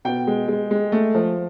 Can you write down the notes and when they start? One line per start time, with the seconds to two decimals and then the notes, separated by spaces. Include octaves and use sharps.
0.05 B2 G5
0.27 G#3
0.48 G#3
0.71 G#3
0.92 A3
1.15 F3